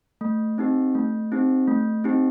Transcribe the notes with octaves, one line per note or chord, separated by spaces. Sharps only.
A3
C4 D#4 G4
A3
C4 D#4 G4
A3
C4 D#4 G4